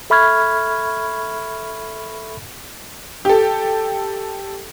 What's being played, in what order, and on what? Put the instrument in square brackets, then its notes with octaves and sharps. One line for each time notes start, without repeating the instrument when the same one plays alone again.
[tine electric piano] A4 E5 B5 C#6 F6 G#6
[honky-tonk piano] G4 A4